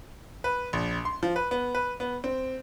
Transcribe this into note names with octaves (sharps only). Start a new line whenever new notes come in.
B4
A#1
C6
F3
B4
B3
B4
B3
C4